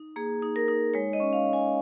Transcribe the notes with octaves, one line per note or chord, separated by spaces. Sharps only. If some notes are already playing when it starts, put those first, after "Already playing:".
Already playing: D#4
A#3 G#4
D#4
A#4
D#4
G#3 C#5
D#5
C#4
F5
G#3
G#5